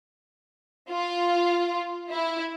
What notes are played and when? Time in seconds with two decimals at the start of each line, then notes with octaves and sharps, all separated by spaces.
0.90 F4
2.11 E4